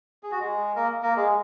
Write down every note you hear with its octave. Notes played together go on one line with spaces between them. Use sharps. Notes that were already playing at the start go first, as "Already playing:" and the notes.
G#4
F#4
G#3 G#4
A#3 A#4
A#3 A#4
G#3 G#4